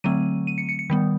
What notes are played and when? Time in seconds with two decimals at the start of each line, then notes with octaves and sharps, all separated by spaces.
0.04 D3 F#3 A3 C4 D#7
0.47 D#7
0.58 C#7
0.69 C#7
0.79 C#7
0.90 D#3 G3 B3